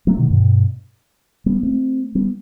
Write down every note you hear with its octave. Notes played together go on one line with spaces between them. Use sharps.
F#3 A3
B2 D#3
G2 B2
G3 B3
A3 C4
G3 B3